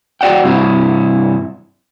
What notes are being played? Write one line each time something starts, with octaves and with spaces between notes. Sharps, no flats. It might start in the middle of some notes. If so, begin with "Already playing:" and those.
F#4 D5 F#5 G5
G2 C3 E4